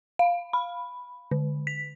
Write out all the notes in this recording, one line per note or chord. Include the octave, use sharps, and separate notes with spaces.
F5
B5
D3
B6